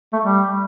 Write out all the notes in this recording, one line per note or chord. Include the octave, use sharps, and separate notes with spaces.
A3
G3